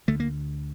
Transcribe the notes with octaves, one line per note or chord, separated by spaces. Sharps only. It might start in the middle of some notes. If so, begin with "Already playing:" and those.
D2 D3 A3
A#3